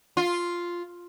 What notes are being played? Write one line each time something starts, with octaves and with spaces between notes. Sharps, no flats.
F4